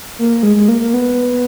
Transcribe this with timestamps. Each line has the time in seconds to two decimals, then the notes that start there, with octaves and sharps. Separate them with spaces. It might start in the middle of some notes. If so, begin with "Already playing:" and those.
0.19 A#3
0.43 G#3
0.56 G#3
0.69 A#3
0.80 A#3
0.94 B3